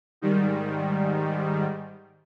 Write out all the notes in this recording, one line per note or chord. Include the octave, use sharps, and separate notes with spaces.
G#2 D#3 G3